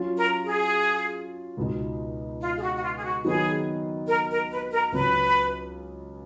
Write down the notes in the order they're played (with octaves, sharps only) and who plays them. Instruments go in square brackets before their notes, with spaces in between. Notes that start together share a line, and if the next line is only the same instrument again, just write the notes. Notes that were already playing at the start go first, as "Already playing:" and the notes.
Already playing: [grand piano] F#3 C#4 F4
[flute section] A#4
G#4
[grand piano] C#2 B2 G#3 D#4
[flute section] F4
G#4
F#4
F#4
F4
G#4
F#4
[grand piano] D#3 F#3 B3 D#4 [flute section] G#4
[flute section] A#4
A#4
B4
A#4
[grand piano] C#2 C#3 F#3 [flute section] B4